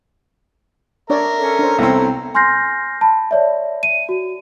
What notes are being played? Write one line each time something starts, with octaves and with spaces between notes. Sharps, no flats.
D4 A#4 C#5 D5 E5 A#5
C#4 A4
D4 C5
C2 A3 B3 C4 E4 A#5
G#5 C6 F6 G6 A#6 C7
A5 B5
C#5 D5 E5
D#7
F#4